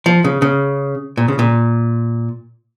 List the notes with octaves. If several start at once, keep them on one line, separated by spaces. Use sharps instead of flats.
F3
C#3
C#3
A#2
C#3
A#2